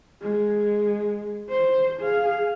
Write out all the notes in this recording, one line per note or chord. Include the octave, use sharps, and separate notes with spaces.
G#3
C5
G#4 F5